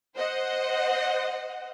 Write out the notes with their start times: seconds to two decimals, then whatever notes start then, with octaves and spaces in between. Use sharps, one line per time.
0.16 C5 D#5 F#5